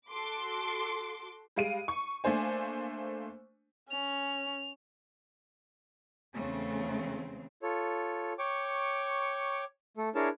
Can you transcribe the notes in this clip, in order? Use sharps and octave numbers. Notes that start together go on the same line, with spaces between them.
F#4 A4 C6 D6
G3 G#3 F5 D7 D#7
C#6
A3 A#3 D4 C5 G#5
C#4 F7
E2 C#3 A3 C4
F4 A4 C#5
C#5 G5 C#6 D6
A3 A4
D4 E4 G#4 A#4 C#5 A5